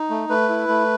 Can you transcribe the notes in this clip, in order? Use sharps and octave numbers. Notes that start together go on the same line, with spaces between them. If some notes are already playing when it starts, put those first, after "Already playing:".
Already playing: D#4
A3
A3 B4
E4
A3